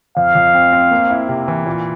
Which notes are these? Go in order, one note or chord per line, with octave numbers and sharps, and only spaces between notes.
F2 F5
F2
C4
C4
A#3
E4
C3
E3
A#2